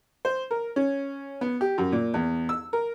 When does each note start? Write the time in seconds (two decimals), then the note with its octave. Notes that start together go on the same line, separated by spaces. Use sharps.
0.25 C5
0.51 A#4
0.76 C#4
1.41 B3
1.61 G4
1.78 F#2
1.92 A#2
2.14 E2
2.49 E6
2.73 A#4